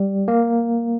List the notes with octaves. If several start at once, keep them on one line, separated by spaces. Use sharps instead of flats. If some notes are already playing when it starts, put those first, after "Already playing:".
Already playing: G3
A#3